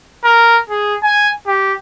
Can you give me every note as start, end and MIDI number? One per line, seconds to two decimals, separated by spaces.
0.24 0.60 70
0.70 0.95 68
1.03 1.30 80
1.47 1.74 67